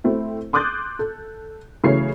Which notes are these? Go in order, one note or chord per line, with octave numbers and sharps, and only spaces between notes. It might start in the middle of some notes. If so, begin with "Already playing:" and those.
A3 C4 E4
C6 D6 D#6 F#6 G6 A6
A4
C#3 E3 F#3 A3 C#5 C7